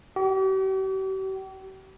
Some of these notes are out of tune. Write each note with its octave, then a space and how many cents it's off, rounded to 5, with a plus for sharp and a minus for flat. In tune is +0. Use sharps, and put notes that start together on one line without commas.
G4 -45